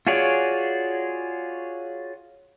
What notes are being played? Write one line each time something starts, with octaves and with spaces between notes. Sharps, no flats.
F4 F#4 G#4 C#5 D5